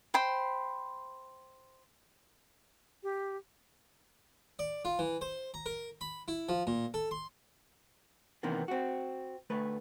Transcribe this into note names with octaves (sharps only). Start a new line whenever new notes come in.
C5 G5 B5 C6
G4
D5
F4
E3
C5
A#5
A#4
B5
E4
F3
A#2
A4
C6
C3 D#3 E3 A#3 B3
C4 F#4
D2 A3 B4